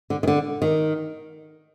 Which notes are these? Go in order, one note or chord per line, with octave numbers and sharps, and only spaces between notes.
D3
D#3
D3
D#3